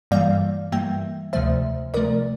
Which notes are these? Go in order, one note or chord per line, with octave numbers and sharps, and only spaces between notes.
G2 E3 G3 A#3 D5 F5
G2 E3 G3 A#3 E5 G5
D2 C3 F3 A3 C5 E5
D2 C3 F3 A3 A#4 D5